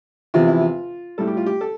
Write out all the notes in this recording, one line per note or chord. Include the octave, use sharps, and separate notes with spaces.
E2 C3 F3 F4
E4
F4
A2 G3 A4
G4
F4
G4
A4